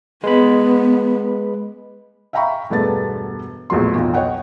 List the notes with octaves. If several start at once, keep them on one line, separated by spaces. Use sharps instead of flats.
G#3 B3 B4 B5
E5 F5 G5 A#5 B5 C#6
E1 G2 A3 B3 B4 A6
A#1 E2 A2 F#3 C6
B1 F2
C#5 D#5 F#5 G5